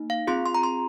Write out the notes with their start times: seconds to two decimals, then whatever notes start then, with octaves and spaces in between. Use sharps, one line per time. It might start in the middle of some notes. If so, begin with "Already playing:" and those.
Already playing: A#3 D#4
0.10 F5
0.27 C4 F4 G#4 C6
0.46 C6
0.55 A#5
0.63 C6